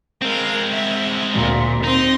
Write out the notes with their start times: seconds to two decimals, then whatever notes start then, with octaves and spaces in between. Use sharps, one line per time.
0.22 G#3 C4 A#4 F5
0.71 E5
1.34 D2 A#2
1.84 C4 D#4 C6